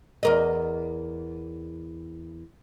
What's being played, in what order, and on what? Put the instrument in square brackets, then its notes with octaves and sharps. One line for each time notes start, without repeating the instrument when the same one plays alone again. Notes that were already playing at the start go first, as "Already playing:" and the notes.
[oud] E2 A#4 D#5